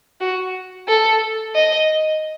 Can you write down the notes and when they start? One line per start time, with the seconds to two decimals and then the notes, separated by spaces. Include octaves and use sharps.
0.21 F#4
0.88 A4
1.55 D#5